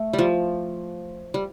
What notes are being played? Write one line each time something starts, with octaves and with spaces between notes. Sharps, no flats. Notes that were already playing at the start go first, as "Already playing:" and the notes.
Already playing: A3
G3
F3
G3